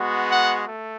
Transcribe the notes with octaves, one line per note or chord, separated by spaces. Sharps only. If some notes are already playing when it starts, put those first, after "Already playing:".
Already playing: G#3 B3 F#4
F#5
A3